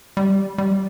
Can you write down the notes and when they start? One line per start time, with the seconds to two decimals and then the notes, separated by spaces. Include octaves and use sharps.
0.17 G3
0.58 G3